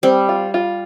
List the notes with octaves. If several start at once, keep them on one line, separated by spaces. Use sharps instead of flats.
G3 C4
F4
F4